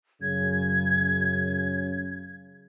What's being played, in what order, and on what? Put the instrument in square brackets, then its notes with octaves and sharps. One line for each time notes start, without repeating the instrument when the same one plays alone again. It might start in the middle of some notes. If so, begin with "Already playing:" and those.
[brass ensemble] F#2 C#3 [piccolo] G#6